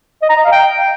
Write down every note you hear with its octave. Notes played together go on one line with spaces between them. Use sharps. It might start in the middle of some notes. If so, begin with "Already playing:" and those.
D#5
A#5
D#5
F5
G5